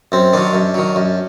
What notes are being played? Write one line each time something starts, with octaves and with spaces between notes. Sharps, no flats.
F#2 C4
D#3 F#3 D4
F#2
D#3 F#3
F#2